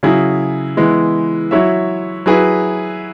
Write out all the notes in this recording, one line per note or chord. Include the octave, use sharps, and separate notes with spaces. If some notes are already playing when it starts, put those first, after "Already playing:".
C#3 F#3 E4 G#4
E3 G#3 B3 E4
F#3 E4 C#5 E5
F#3 E4 G#4 B4